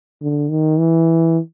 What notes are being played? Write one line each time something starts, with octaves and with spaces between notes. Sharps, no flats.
D3
D#3
E3